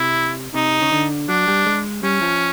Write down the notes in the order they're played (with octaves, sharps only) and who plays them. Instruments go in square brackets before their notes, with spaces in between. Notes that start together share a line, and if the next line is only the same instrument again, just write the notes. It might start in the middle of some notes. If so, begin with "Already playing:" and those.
Already playing: [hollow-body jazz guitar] C3 [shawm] E4
[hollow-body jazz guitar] C3 [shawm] D#4
[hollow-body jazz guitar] C#3
D3
[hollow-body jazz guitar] F#3 [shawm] D4
[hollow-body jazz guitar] G3
G#3
[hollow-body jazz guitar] G3 [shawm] C#4
[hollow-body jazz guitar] F3